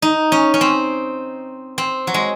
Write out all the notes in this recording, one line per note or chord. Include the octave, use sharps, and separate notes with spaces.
D#4
C#4
C#4
C4
C4
F#3
G#3